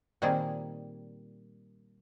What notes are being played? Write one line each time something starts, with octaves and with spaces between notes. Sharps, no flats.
A#2 D#3 G3 A#3 C4 G#4